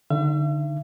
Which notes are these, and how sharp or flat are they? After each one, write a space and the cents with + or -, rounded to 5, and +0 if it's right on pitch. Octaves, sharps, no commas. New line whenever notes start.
D3 +0 D#4 +0 E5 +45